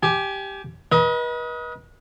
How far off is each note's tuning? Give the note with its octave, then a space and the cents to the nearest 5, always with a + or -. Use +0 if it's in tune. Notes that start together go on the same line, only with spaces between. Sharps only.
G4 +0 G#5 +25
B4 -35 D#5 +25